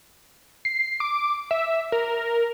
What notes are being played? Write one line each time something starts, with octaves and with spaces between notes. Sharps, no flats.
C7
D6
E5
A#4